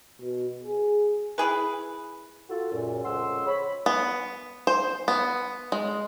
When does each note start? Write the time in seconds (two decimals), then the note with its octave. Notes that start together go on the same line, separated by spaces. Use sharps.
0.21 B2
0.64 G#4
1.38 E4 G#4 B4
2.49 F4 F#4 A4
2.72 C#2 F#2 A#2
3.05 F2 C#3 G#3 F#5 C6 E6
3.47 C#5 B5
3.86 B3
4.67 C5
5.08 B3
5.72 G#3